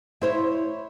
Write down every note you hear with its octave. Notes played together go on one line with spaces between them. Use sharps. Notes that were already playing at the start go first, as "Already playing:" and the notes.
E4 C5 C#5